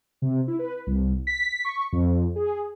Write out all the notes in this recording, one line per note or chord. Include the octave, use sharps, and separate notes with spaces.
C3
E4
B4
C2
B6
C#6
F2
G#4